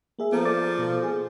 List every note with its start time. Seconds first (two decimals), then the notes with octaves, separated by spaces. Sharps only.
0.19 A#3 G#4 E5
0.32 F3 B3 A4 A#5
0.45 D5 D6 A6
0.78 B2 A4
1.03 B3 G#4